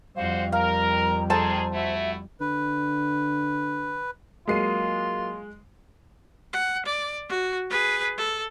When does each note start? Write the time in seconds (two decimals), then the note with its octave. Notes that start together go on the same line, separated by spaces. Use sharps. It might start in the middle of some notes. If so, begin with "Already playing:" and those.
0.16 F2 D3 G3 F#4 C5 F5
0.52 A#4 F5 A#5
1.30 C3 D#3 G#4 A4 C5 A5 A#5
1.73 A3 E4 F#4 E5
2.40 D3 B4
4.47 F#3 G#3 A#3 F4 C7 D#7
6.53 F#5
6.85 D5
7.29 F#4
7.70 G#4 B4
8.17 A4